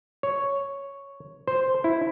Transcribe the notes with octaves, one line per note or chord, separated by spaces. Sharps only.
C#5
C5
E4